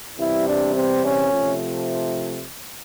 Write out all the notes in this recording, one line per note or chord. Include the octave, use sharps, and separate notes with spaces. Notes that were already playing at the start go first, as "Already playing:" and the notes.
E2 C3 E3 G3 E4
D4
C4
C#4
C3 F3 A3